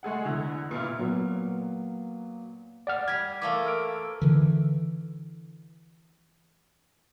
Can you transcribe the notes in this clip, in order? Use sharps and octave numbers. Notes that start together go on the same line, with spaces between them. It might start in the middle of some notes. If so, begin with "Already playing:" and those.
G#3 A3 G#4 F#5
E2 D3
A#2 B3 E4 F4
A#2 F#3 B3
D5 F#5 F6
G3 G4 G#6
E3 A3 A#3 F5 D6
E6 F6 D7
D3 E3